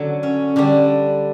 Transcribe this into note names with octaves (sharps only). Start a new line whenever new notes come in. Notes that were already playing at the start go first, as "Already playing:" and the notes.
Already playing: D3 F#3
C#4
D3 G3 D4